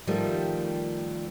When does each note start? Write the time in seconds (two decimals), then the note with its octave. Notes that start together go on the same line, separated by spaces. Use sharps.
0.07 D#3 F3 G3 A3